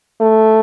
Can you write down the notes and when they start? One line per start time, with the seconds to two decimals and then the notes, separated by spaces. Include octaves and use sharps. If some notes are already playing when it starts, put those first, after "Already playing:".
0.20 A3